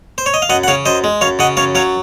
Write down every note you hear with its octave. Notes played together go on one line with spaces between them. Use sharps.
C5
C#5
D#5
F5
F#2 D#5 F#5
F#5
C#3 C#5 F5
F#2 C5 D#5
G#3
F#2 C#5 F5
C#3 D#5 F#5
F#2 C#5 F5
F#3 C#5 F5